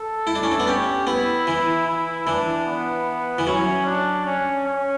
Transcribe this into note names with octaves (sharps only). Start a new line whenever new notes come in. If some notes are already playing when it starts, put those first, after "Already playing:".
Already playing: A4
E4
D4
C#4
D4
B3
C#4 G4
B3 E4
E3
E4
E3 D4
B3
E3
F#3 C#4
D4
C#4
C#4